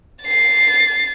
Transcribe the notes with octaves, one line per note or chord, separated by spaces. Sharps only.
A6 C7